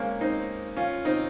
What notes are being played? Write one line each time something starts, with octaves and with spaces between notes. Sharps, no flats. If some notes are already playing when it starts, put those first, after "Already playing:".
Already playing: G#3 A#3 C4 C#4
C4 D#4
C#4 F4
C4 D#4